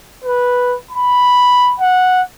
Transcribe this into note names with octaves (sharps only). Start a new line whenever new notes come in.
B4
B5
F#5